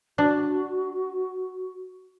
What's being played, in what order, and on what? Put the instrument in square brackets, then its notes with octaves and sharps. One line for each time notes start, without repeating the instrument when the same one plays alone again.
[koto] D4 [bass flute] F#4